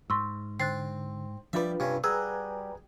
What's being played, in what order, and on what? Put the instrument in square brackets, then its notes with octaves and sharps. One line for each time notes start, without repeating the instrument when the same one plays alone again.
[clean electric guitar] G#2 [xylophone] C6 C#6 E6
[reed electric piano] D3 [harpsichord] C4 [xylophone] F#6 A6 C7
[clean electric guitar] F3 G3 B5 [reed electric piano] D4 F4 B4 [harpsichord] D5 E5
[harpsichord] G2 C#4 [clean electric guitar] C3
[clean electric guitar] G3 F#4 [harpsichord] G#4 [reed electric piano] B4 G#5 A#5 [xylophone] E6